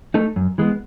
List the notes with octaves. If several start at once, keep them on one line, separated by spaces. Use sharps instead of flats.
A3 D#4 A4
F#2
E3 G#3 B3